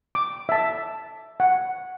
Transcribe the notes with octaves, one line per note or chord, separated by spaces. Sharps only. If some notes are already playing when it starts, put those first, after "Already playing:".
D6
E5 A5
F#5